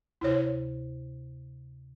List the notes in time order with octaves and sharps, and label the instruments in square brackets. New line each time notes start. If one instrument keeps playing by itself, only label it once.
[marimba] D2 C3 C5 [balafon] E4 C#5